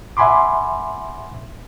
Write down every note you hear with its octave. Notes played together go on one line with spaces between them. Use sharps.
E5 F#5 G#5 B5 C6 D6